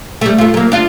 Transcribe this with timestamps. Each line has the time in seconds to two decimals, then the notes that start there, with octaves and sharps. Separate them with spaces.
0.21 G3 A3
0.38 A3 F4
0.54 F#3 A#3
0.72 D4 F4